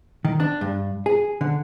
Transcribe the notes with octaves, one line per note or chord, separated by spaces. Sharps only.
D#3
D4
G2
G#4
D3